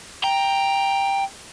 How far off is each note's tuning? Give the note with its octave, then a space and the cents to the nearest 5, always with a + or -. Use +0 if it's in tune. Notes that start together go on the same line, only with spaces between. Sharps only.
G5 +10 A#5 +0